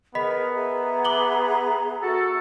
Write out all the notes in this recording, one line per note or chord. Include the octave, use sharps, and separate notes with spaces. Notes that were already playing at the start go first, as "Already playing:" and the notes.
B3 G#4 A#4 D#5 B5 B6
G#4 E5 A#5
D6 F#7 G7
F#4 A4